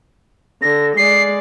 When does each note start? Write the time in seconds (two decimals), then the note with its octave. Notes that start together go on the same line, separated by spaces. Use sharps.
0.62 D3 A#6
0.97 G#3 D5 C7